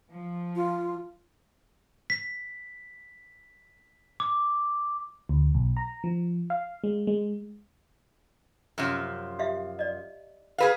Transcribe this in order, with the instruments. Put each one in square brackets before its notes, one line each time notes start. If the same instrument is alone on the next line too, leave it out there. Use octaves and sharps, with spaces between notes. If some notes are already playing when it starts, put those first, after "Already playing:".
[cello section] F3
[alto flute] F4
[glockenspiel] B6
D6
[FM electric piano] D2
B1
A#5
F3
F5
G#3
G#3
[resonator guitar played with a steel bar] F#2 C3 F3
[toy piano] G4 E5 F5
D5 D#5
[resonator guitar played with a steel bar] G#4 B4 F5